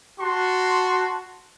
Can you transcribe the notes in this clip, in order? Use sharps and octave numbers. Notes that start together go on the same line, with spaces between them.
F#4 A5 C6